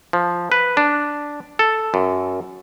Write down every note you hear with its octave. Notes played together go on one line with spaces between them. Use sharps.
F3
B4
D4
A4
F#2